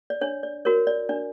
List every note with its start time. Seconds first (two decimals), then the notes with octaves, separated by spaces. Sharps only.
0.10 D5
0.21 D4 C#5
0.43 D5
0.65 F#4 A#4 C#5
0.87 D5
1.09 D4 D5